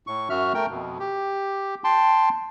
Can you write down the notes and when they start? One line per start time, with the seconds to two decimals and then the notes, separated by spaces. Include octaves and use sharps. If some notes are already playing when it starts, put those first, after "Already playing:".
0.07 A2 C#6
0.30 F#2 F#4 E5 F6
0.54 A3 A#4 G5
0.70 F2 B2
1.00 G4
1.84 G5 A5 C6